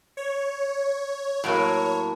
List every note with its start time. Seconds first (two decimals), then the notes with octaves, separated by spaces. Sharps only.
0.17 C#5
1.44 A2 F#3 A#3